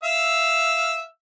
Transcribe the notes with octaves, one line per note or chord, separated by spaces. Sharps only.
E5 F5 E6